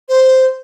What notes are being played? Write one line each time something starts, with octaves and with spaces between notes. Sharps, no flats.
C5